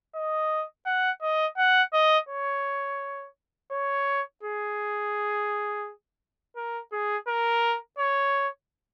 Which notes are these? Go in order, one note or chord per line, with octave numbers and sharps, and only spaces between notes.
D#5
F#5
D#5
F#5
D#5
C#5
C#5
G#4
A#4
G#4
A#4
C#5